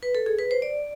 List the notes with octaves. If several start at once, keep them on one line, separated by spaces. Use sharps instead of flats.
B4
A4
G#4
B4
C5
D5